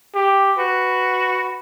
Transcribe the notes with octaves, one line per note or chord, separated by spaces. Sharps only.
G4
F#4 B4